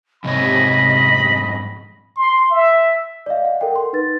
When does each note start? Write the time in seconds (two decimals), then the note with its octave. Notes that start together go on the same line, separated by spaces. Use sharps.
0.24 F2 G#2 C3 C#5 D#5 B5
2.16 C6
2.51 E5
3.26 D5 D#5 F5
3.45 F#5
3.61 A4 A#4 F#5 G5
3.76 C6
3.93 D#4 B4 A6